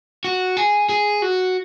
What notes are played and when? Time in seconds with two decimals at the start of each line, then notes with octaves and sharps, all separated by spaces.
0.25 F#4
0.57 G#4
0.89 G#4
1.22 F#4